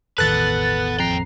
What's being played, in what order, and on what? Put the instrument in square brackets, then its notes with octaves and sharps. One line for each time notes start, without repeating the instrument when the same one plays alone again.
[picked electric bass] E1 A1 D#3 [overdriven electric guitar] B3 B4 [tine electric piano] A4 [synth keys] F#6 A6
[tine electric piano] F2 A#5 C7 [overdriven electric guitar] A#2 G5